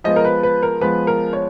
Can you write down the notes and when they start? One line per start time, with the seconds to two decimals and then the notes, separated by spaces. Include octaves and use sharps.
0.04 F3 G#3 B3 D#5
0.16 A#4
0.25 B4
0.43 B4
0.63 A#4
0.81 F3 G#3 B3 B4
1.07 A#4
1.33 C#5